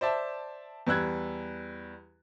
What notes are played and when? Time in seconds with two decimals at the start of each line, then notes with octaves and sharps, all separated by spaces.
0.01 C5 D5 E5 A5
0.87 E2 G3 E6 F#6 G#6